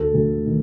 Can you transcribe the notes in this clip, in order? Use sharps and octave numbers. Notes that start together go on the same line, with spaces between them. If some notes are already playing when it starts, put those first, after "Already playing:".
Already playing: D2 A4
D2
D#3